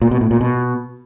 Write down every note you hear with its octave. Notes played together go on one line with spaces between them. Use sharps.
A#2
B2
A2
A#2
B2